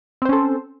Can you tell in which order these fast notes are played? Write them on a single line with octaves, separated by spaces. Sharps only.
C4 C5 C#4 A4